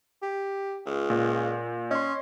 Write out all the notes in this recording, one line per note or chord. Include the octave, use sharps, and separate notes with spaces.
G4
C#2
A#2
C#4 D#5 C6